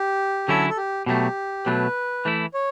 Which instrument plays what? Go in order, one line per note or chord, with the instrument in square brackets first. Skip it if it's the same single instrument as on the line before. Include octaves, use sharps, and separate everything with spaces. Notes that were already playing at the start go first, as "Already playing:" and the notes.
Already playing: [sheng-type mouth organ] G4
[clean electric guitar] D3 F#3 C#4 E4 [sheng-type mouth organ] A4
[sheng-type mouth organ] A4
G4
[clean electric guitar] B2 F#3 A3 [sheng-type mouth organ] G4
[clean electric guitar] B2 F#3 A3 [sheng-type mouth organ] B4
[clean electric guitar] E3 A3 E4
[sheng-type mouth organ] C#5